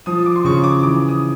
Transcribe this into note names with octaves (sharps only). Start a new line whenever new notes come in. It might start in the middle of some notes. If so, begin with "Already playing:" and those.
F3 D#6
D6
C6
C#3 C#6
D6
E3 D6
D#6